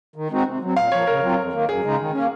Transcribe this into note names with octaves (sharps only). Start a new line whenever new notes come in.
D#3
G#3 C4 D#4 F#4
C3
F#3 C4
A#2 F5
F3 A#3 C#5
C#3 A#4
F#3 C4 F4
F2
D#3 A#3
F#2 G#4
C#3 G#3 D#4
D#3
A#3 C#4